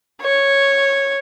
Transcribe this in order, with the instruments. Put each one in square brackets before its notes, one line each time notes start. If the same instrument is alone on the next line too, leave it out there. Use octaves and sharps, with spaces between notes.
[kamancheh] C#5